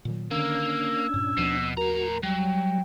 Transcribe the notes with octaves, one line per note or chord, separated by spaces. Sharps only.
A#2 D#3 F#3
D3 D#3 A#3 C#4 D4 E6 G#6
G2 A#2
D#2 B2 F3 C4
A2 F#4 A#4 A#5
F#3 G3 G5